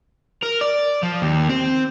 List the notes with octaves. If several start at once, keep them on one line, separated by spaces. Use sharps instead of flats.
A#4
D5
F3
D#2
C4